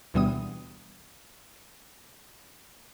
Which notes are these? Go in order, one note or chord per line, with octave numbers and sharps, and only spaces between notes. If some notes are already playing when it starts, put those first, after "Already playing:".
D2 B2 E3 G3 B3 D#6